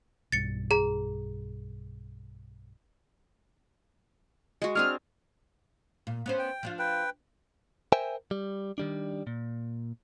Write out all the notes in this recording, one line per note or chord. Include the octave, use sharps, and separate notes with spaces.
B1 G2 A6 C#7
G#4 A#5
G#3 F#4
C4 D4 G#4 F6
A#2
B3 C#4 C5
G5
F3 D4 F4
B4 G5
A#4 C5 E5 G5 G#5
G3
D#3 G3 D4
A#2